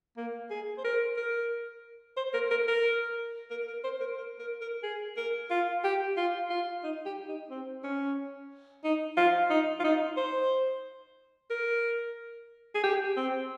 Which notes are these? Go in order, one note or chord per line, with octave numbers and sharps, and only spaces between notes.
A#3
G#4
C5
A#4
A#4
C5
A#4
A#4
A#4
A#4
A#4
C5
A#4
A#4
A#4
A#4
G#4
A#4
F4
G4
F4
F4
D#4
G4
D#4
C4
C#4
D#4
F4
D#4
F4
D#4
C5
A#4
G#4
G4
C4